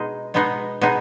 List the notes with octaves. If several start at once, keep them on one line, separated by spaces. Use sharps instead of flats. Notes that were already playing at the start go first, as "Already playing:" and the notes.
Already playing: B2 G#3 D#4 G#4
B2 G#3 B3 D#4 G#4
B2 G#3 B3 D#4 G#4